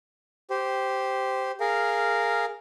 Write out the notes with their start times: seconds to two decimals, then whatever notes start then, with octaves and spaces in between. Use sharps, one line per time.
0.50 G4 C5
1.60 G#4 A#4 F5